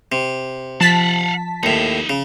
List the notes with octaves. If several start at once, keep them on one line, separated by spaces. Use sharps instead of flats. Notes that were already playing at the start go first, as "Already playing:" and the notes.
C3
F3 F5 F#5 A5 B6
D#2 A2 D#4 E5
C#3